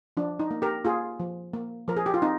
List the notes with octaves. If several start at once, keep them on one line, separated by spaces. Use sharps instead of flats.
F3 D4
D#4
A#3
G4 A#4
A#3 F4 G#4
F3
A#3
F3 A#4
G#4
G4
F4
C4 D#4